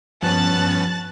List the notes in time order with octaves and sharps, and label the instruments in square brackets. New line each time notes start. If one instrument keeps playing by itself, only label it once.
[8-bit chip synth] G2 B3 C#4 [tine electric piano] F3 [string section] A5 F#6 A6